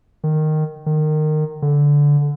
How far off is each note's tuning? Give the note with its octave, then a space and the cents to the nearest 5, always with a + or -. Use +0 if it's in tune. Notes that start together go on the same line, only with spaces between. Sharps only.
D#3 -10
D#3 -20
D3 -15